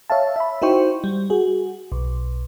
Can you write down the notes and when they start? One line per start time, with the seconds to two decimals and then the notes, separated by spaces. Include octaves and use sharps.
0.10 C#5 E5 F5 A5
0.36 E5 B5
0.62 D#4 E4 F#4 C5 G5 C#6
1.04 G3
1.30 F#4 G#4
1.92 B1